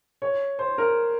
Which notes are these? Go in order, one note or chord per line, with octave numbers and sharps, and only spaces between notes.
C#5
C5
A#4